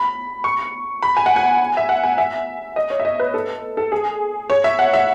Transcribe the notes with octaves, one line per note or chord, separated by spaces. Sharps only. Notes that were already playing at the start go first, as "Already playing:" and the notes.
Already playing: B5
C#6
B5
G#5
F#5
G#5
E5
F#5
G#5
E5
D#5
C#5
E5
D#5
B4
A4
A4
G#4
C#5
E5
F#5
E5